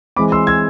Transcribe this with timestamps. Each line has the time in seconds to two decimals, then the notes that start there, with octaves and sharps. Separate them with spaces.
0.17 E3 G#3 C4 B5 D6
0.32 C6 E6
0.47 E6 G#6